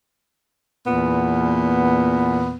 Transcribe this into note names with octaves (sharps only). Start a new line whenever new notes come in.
E2 A#2 B3